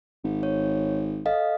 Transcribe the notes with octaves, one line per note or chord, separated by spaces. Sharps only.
G#1
C#5
A4 D#5 F5